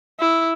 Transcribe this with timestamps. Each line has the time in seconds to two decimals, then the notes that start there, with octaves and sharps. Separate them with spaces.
0.20 E4